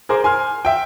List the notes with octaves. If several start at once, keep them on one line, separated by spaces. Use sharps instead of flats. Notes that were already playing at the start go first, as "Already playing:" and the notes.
G#4 A#4 C5 D6
G#5 C6 F6
E5 G5